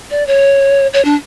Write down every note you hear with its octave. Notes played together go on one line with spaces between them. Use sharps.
D5
C#5
C#5
D4